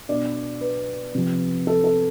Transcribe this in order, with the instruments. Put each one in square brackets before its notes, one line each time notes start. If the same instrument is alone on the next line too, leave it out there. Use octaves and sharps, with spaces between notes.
[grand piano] B2 D4 D5
B4
C3 F3
A4
A4